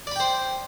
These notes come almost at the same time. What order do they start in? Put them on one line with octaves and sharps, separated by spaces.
D5 B5 G5 C5